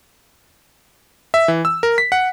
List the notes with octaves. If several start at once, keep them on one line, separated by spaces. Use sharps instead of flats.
E5
E3
E6
A#4
B6
F#5